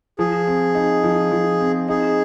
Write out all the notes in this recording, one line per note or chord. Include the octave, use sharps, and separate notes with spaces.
F3 G#4
C4
D#4
F3
F3
C4
D#4 G#4